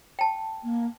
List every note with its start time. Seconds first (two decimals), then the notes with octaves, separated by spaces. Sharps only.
0.19 G5 A5
0.63 A#3